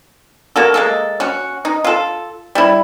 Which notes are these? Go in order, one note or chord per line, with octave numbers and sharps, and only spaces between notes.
A#3 F#4 A4
G#3 A#3 A4
C#4 F#4
D#4
F4 A4
G3 E4